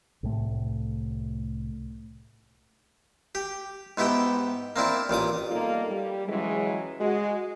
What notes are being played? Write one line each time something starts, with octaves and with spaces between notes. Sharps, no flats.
C2 A2 A3
G4
G#2 B3 E4 G4 G5
A#3 C4 D4 E4
A1 A#2 D6 D#6
G3 A#3 B3 D#4 F4 A4
G3
C#3 E3 F#3 G#3
G#3 F#4